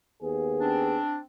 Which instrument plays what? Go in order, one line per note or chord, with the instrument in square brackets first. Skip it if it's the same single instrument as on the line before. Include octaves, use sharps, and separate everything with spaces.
[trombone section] D#2 B3 G#4
[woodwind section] C4 D4